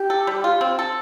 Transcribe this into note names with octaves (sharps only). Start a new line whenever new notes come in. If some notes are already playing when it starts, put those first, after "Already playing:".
Already playing: G4
A4
G3
F4
C4
A4